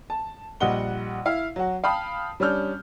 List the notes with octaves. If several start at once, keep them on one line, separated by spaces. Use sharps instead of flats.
A5
A#1 G3 D#5 F#5 G7
E4 F5
F#3 F#4
F5 G5 A5 B5 D#6
G3 C#4 D4 F6 G6